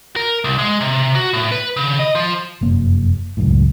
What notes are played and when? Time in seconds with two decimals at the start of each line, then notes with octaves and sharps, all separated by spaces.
0.16 A#4
0.44 C2
0.59 G#3
0.81 C3
1.16 F#4
1.33 A2
1.52 B4
1.77 C#3
1.99 D#5
2.15 F3
2.61 F1 F#2 A#3
3.37 C#2 F#2 A2